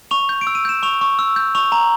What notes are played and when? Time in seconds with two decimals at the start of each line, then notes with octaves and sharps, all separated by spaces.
0.11 C#6 F7
0.29 G6
0.41 D7
0.47 E6
0.55 D#7
0.65 G6 E7
0.83 C#6 F7
1.01 C#6
1.19 E6
1.36 G6
1.55 C#6 F7
1.72 A#5